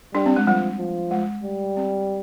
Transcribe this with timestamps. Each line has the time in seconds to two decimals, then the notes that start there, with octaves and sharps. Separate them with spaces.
0.14 G3 D4
0.26 C4
0.36 G#3
0.46 F3 G3
0.78 F3
1.11 G#3
1.44 G3
1.77 C4